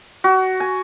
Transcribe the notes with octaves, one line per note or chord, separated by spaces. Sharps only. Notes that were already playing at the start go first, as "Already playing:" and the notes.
F#4
G#5